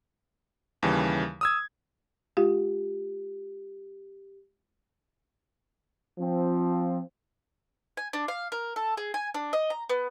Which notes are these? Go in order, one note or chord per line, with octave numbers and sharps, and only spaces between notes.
D#2 C#3 E3 G3
D#6 E6 G#6
G#3 F4 G4 F5
F3 C4
G#5
D4
F5
A#4
A4
G#4
G#5
D4
D#5
A#5
B3